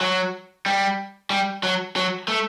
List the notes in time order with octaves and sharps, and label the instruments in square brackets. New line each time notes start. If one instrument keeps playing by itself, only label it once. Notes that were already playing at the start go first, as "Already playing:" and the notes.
[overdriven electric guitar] F#3
G3
G3
F#3
F#3
A3